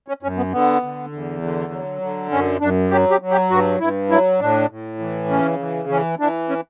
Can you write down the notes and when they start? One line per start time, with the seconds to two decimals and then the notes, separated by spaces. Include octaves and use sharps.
0.08 C#4
0.22 F#2 C#4
0.37 B3
0.52 D3 B3
0.83 D3
1.12 E2
1.42 D3
1.72 F#3
2.02 D3
2.31 F#2 C#4
2.61 F#2 D4
2.91 F#3 G4
3.11 G4
3.21 F#3
3.31 G4
3.50 G2 F#4
3.80 G2 E4
4.10 F#3 E4
4.40 A2 D4
4.70 A2
4.99 E3
5.29 C#3 C#4
5.59 E3
5.89 E3 C#4
6.19 E3 D4
6.49 C#4